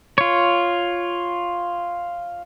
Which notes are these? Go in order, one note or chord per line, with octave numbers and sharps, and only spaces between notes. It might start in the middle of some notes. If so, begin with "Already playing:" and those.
F4 C#5